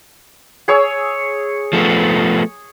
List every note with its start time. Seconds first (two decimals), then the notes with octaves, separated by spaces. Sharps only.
0.68 G#4 C#5 E6
1.73 F3 A3 B3